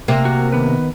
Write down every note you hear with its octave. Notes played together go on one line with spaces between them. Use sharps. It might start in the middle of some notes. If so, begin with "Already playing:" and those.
C3 A#3 C5
F#4
D#3 B3 B4